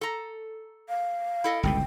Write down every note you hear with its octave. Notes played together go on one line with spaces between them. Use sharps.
A4 A#5
F5
E4 A4 D#5
G1 C#2 B2 G5